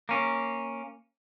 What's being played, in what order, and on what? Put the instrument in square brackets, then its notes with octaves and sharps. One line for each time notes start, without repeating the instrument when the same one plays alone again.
[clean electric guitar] A#3 C#4